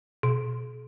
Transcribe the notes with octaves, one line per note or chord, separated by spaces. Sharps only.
B2